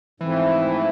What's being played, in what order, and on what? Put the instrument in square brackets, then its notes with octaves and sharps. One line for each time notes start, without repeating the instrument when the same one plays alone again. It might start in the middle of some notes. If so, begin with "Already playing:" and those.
[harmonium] G#2 F3 A3 C4 E4 [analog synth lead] E3